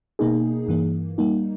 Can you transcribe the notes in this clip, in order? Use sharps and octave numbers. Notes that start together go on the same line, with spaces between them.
B2 A#3 D#4 G#4
G2 E3 A#3
G3 A#3 D#4